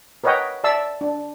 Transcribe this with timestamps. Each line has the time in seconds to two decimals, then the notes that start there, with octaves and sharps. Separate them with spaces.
0.24 A#4 B4 C#5 D#5 F#5 G5
0.64 D5 E5 A5 E6
1.01 D4